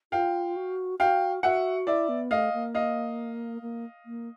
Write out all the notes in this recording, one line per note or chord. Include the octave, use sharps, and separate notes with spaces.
F4 F5 G5
F#4
F#4 F5 G5
F#4 E5 F#5
E4 D5 E5
B3
A3 D#5 F5
A#3
D#5 F5
A#3
A#3